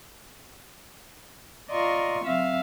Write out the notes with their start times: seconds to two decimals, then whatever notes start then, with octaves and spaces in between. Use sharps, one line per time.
1.71 F4 D5 D#5 A#5 C6 C#6
2.23 F#3 C4 E5 F5